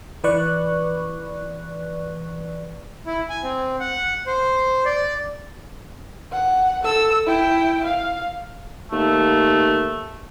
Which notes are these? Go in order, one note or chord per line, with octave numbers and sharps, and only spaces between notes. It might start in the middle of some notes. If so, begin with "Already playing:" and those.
E3 B4 D5 C#6 F#6
E4
G#5
C4
F#5
C5
D5
F#5
A4 E6
E4 G5
F5
D#2 A3